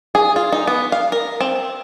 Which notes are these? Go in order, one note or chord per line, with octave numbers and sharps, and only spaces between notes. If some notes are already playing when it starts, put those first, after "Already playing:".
G#4
F4
D#4
B3
F5
A#4
C4